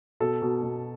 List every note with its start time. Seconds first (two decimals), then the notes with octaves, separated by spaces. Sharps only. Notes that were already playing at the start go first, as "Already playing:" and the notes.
0.20 B2 A4
0.42 B2
0.63 B2